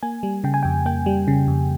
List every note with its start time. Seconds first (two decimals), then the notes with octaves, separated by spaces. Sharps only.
0.03 A#3 G#5
0.23 G3
0.44 C#3 G5
0.54 G#5
0.63 F2 G5
0.86 A#3 G5
1.06 G3
1.28 C#3
1.48 F2